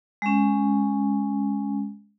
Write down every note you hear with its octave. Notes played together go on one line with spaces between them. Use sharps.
G#3 C#4